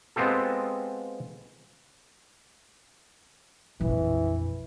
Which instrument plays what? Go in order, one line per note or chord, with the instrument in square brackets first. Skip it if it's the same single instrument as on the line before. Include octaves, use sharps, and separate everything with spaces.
[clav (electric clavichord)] G#3 B3 C4 F4 G4 A4
[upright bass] A#1 F2 [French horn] E3